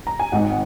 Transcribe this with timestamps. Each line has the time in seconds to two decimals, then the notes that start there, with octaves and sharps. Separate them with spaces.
0.07 A#5
0.20 G#5
0.32 G#1 G#2 D#3 D#5 F#5